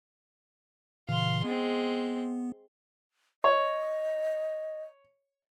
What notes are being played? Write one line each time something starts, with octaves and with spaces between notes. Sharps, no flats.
A#2 C#3 E3 F5 C6
G#3 B3 C4
C#5 D#5